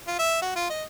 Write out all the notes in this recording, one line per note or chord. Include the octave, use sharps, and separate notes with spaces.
F4
E5
F#4
F4
D#5